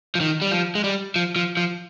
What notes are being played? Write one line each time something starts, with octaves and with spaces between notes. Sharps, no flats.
F3
D#3
G3
F3
G#3
G3
F3
F3
F3